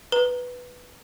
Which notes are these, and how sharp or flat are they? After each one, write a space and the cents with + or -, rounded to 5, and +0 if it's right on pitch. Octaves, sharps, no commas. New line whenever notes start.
B4 +0 A#5 +0